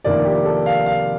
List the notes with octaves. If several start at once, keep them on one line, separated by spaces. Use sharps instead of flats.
F1 F2 D#3 A#3 D4 D5
G4
A4
F5
F5